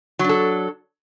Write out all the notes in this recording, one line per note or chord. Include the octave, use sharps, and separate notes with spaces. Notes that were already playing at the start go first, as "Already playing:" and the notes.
F#3 D4 A4